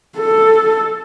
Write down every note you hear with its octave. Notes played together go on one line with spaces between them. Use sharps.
A4